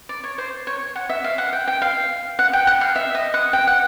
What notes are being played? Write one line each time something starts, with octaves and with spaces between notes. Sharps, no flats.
D5
C#5
C5
C#5
F#5
E5
F5
F#5
G5
G5
F5
F#5
G5
F#5
F5
E5
D#5
F#5
G5
F#5